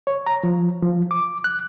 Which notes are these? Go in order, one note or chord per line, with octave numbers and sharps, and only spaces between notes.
C#5
A#5
F3
F3
D6
F#6